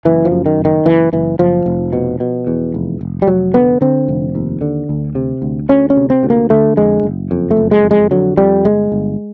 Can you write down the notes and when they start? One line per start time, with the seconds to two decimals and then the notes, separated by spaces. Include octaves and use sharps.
0.05 F#1 E3
0.25 F3
0.31 F#2
0.46 D#3
0.58 F#1
0.65 D#3
0.85 F#1 E3
1.13 F#1 E3
1.39 F#1 F3
1.66 F1
1.93 B2
2.20 B2
2.47 E2
2.74 F1
3.01 F1
3.22 G3
3.27 F1 F#3
3.54 D3 B3
3.81 D3 C4
4.08 F1
4.35 D#2
4.61 D3
4.89 D2
5.15 C3
5.42 D2
5.69 D2 C#4
5.90 C#4
5.97 C3
6.10 C4
6.23 D2
6.30 A#3
6.50 D3 A3
6.77 F2 G#3
7.03 F#1
7.31 F2
7.51 A3
7.57 F#1
7.71 G#3
7.84 F2
7.91 G#3
8.11 D3 F#3
8.37 F2 G3
8.65 G1 G#3
8.92 G1